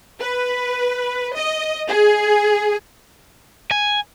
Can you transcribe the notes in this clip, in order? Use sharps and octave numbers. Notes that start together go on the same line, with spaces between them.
B4
D#5
G#4
G#5